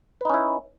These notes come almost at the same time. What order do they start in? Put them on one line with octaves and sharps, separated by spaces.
B4 D#4 C#4 E4